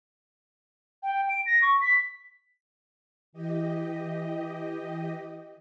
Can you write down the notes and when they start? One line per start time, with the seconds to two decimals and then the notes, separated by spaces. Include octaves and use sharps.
1.03 G5
1.29 D7
1.46 A#6
1.62 C#6
1.81 B6
3.32 E3 G4 D#5